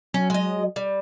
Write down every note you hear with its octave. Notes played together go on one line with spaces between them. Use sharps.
F#3 C#4
G#3 D#5
G3